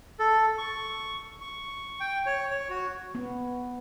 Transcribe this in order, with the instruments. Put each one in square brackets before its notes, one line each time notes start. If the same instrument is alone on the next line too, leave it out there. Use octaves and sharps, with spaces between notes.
[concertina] A4
C#6
C#6
G5
C#5
C#5
F#4
[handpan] B3